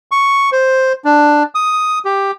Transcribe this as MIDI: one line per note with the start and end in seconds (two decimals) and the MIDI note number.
0.11 0.50 85
0.52 0.93 72
1.04 1.43 62
1.55 1.99 87
2.05 2.31 67